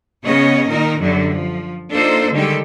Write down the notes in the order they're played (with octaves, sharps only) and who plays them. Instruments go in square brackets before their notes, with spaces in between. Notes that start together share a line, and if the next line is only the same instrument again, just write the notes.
[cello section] C#3 B3 C#4 C#5 D#5
A#2 D#3 D#4 A#4
F#2 D3 F#3 G3
F3
A#3 D4 D#4 F4 A4 C5
D3 D#3 G3 G#3 G4 A4